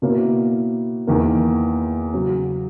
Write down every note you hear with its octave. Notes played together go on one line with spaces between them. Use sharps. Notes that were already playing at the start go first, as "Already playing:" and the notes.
B2 A#3 C#4 E4
E2 D#3 A#3
C#3 F#3 C#4